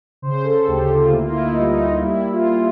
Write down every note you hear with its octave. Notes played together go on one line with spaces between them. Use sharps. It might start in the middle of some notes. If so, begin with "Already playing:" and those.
C#3 C5
A4
D2 G4
F4
A#3 E4
F4
E4
D#4
G3
D#4
G3 E4
F4